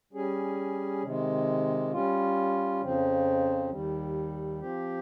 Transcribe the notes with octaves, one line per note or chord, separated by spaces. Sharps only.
G3 C#4 G#4
C3 D#3 G#3
G3 C#4 F4
F2 C#3 F3 C4
D#2 D#3 G3
F3 C4 G4